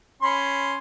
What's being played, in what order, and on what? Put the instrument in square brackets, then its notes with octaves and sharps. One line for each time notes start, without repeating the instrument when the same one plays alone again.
[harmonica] C#4 B5 C6